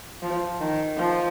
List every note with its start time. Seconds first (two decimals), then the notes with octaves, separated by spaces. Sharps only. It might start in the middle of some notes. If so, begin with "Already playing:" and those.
0.22 F3
0.61 D#3
0.98 F3